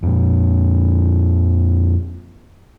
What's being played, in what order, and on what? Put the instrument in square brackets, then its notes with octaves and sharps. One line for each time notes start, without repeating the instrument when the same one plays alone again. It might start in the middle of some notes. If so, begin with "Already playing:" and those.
[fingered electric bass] F2 A#2